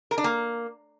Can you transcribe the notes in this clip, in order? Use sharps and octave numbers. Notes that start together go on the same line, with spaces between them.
A#4
D4
A#3